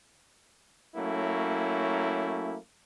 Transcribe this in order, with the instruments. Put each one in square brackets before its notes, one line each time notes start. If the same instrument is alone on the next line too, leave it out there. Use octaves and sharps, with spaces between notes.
[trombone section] F#3 A3 A#3 C#4 E4